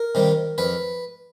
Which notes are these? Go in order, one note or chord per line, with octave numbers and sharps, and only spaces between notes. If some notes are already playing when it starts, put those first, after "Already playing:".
Already playing: A#4
C3 D#3 G3
F2 B4